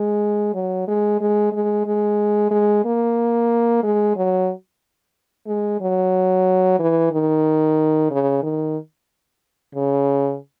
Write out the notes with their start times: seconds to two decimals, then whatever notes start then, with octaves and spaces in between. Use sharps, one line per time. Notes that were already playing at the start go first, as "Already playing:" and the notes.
Already playing: G#3
0.54 F#3
0.88 G#3
1.21 G#3
1.52 G#3
1.87 G#3
2.51 G#3
2.85 A#3
3.83 G#3
4.16 F#3
5.47 G#3
5.81 F#3
6.80 E3
7.12 D#3
8.11 C#3
8.43 D#3
9.75 C#3